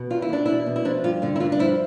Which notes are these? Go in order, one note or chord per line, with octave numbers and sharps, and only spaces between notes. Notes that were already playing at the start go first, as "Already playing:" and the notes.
Already playing: B2
E2 F4
E4
E2 D4
B2 E4
B2
E4
F3 D4
G2 F4
D3 F4
E4
G2 F4
D4
F3 E4